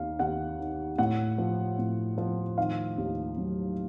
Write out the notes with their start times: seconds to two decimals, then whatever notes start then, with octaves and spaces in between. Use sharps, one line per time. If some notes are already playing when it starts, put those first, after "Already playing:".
Already playing: D#2 D#3 F5
0.19 D#2 F#5
0.59 D#3
0.98 A2 F#5
1.38 F3
1.78 A2
2.18 F3
2.58 D#3 F5
2.98 D#2
3.38 F#3